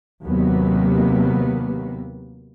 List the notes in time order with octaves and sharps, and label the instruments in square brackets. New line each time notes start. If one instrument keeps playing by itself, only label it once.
[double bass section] D#2 C3 F#3 A#3 B3